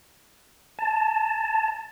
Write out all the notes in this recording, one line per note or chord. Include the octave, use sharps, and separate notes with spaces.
A5